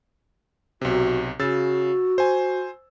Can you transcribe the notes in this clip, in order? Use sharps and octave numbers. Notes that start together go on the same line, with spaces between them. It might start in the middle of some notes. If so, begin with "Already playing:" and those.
B1 C3 F#4
C#3 F#4 E6 A6
C5 G#5